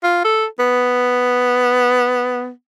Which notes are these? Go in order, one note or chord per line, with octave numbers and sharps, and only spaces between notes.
F4
A4
B3